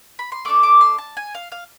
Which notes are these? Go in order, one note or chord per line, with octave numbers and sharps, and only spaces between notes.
B5
C6
A3 D4 A4 D6
D6
C6
A5
G#5
F5
F5